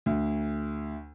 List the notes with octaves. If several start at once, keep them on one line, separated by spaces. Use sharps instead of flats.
D2